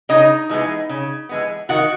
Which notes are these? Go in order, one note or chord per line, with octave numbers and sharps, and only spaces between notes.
C#3 D#4 D#5
E3 G#3 B3
C#3
E3 G#3 B3
D#3 F#4 F#5